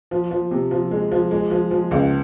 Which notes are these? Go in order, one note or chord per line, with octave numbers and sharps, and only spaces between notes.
F3
F3
C3
F3
G#3
F3
G#3
F3
F3
C#2